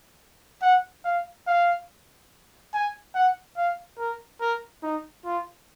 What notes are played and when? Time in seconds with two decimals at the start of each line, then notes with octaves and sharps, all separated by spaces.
0.62 F#5
1.05 F5
1.47 F5
2.74 G#5
3.15 F#5
3.57 F5
3.99 A#4
4.41 A#4
4.83 D#4
5.25 F4